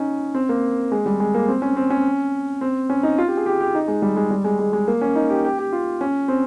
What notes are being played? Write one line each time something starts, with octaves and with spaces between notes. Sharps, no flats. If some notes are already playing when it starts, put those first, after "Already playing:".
Already playing: C#4 D#4
C4
A#3
G#3
G3
G#3
A#3
C4
C#4
C4
C#4
C4
C#4
D#4
F4
G4
G#4
G4
G4
D#4
G#3
G3
G#3
G3
G#3
G#3
G#3
A#3
C#4
D#4
G4
G4
G4
F4
C#4
C4